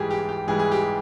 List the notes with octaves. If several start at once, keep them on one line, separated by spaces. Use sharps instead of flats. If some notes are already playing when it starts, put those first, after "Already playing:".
Already playing: G#2 E3 G3 G4 G#4
G4
G4
G#2 E3 G3 G#4
G#4
G4